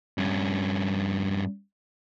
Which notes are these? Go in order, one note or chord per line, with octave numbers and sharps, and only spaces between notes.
G2 C#4